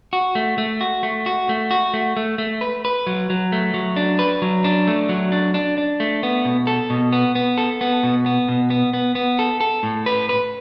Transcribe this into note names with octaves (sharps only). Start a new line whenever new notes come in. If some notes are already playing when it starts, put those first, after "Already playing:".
F#4
A3
A3
F#4
A3
F#4
A3
F#4
A3
A3
A3
B4
B4
F#3
F#3
A3
F#3
D4
B4
F#3
D4
A3
F#3
D4
D4
D4
A3
B3
B2
A4
B2
B3
B3
A4
B3
B2
B3
B2
B3
B3
B3
A4
A4
A2
B4
B4